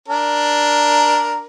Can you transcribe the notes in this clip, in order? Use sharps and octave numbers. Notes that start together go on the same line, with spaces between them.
D4 A#4